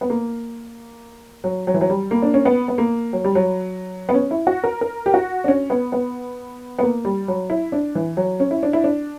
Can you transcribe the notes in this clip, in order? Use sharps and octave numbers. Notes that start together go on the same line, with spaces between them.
B3
A#3
F#3
F#3
E3
F#3
G3
A#3
D4
C#4
B3
B3
A#3
F#3
G3
F#3
B3
C#4
E4
F#4
A#4
A#4
G4
F#4
D4
C#4
B3
B3
B3
A#3
G3
F#3
E4
D4
E3
F#3
C#4
E4
D4
E4
D4